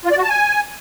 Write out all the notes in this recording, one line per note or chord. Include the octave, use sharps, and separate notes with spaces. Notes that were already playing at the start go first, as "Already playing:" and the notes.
F4
D5
F#4
A5
G#5